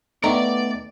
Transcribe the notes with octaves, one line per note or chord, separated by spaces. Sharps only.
D#3 A3 B3 D5 A#5